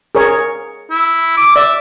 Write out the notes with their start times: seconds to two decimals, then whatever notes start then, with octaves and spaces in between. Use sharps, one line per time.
0.15 G#4 A#4 C#5
0.90 E4
1.37 D6
1.56 D5 E5